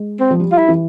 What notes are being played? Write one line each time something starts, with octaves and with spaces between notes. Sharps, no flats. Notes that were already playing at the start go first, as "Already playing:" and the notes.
Already playing: G#3
C4
F3
G3
F4
E4
E3